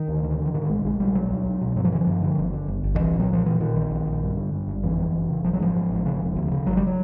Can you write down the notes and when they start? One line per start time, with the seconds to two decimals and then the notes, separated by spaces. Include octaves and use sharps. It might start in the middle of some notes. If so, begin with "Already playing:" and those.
Already playing: D#3
0.08 D2
0.23 D3
0.39 D3
0.46 E3
0.54 G#2 D#3
0.69 A#1 G#3
0.84 A#1 G#3
1.00 A#1 G3
1.15 B2 F#3
1.30 C#2
1.46 C#2
1.61 B2
1.76 G2 F#3
1.85 F3
1.92 D3 E3
2.01 F3
2.07 G2
2.22 D3
2.38 G1
2.53 D3
2.68 G1
2.84 G1
2.95 D#3
2.99 C2 E3
3.15 A#2
3.20 F#3
3.30 A#2 F3
3.45 A#2 E3
3.60 A#2 D#3
3.75 A#1
3.91 A#1
4.06 A#1
4.22 G2
4.37 D3
4.53 G2
4.67 G#1
4.83 F2 E3
4.98 F2
5.13 F#1
5.30 C#3
5.44 A1 F3
5.53 F#3
5.60 G#2 F3
5.75 G#2
5.91 A1
6.06 C#3
6.21 E1
6.36 D2
6.52 C#3
6.66 G#1 F#3
6.77 G3
6.87 F#3